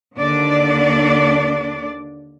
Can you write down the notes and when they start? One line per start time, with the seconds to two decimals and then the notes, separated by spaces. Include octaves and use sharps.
0.17 D#2 D3 D4 D5